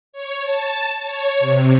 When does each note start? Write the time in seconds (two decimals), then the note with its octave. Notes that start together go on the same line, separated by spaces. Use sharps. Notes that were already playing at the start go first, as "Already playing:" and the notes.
0.13 C#5
0.43 A5
1.03 C#5
1.40 C3